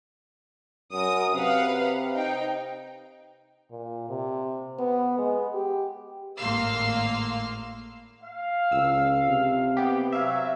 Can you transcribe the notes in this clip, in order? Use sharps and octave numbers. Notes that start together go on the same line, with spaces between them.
F#2 A#4 D#6
C3 B4 F5 F#5
D#4 G5
A#2
C3
B3
G#3
G4
G#1 A2 A#3 F5 C6 E6
F5
C#2 E6
C3
B3 G4
F#3 E5 F5